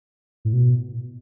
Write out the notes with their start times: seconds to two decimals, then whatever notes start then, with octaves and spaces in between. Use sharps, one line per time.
0.45 A2
0.53 B2